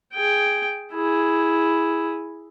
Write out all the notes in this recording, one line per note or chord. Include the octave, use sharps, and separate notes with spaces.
G#4 G5
E4 G#4